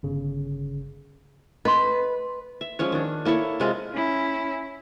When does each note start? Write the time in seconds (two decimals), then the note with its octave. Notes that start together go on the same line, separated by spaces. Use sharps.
0.03 G1 C#3
1.65 B4 D#5 C6
2.61 E5
2.79 F3 G#3 C#4 C#5
2.92 D#3 D4
3.25 A#3 E4 A4 C#5
3.60 C3 G#3 F4
3.93 C#4 E4